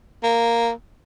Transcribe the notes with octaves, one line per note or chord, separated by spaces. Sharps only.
A#3